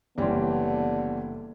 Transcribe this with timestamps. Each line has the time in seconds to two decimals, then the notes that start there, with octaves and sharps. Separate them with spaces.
0.18 F#1 D3 E3 G3 B3 C#4 D5 C6